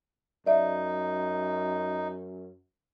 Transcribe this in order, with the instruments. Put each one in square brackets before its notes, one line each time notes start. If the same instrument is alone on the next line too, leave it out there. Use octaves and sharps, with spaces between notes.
[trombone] F#2 [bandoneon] D#4 [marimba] D5 E5